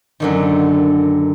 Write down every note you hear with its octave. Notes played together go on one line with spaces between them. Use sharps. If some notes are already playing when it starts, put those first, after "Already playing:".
F#2 D3 D#3